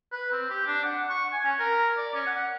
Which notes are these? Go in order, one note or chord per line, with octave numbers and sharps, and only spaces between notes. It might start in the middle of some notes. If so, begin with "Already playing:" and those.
B4
C4
G4
D4
F#5
C#6
G#5
C#4
A#4
D5
C#4
F#5